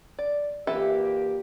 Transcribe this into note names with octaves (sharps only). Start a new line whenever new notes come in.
D5
A#2 E3 A#3 G4 A4 E5